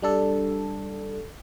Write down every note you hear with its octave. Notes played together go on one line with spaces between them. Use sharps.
G3 D4 A4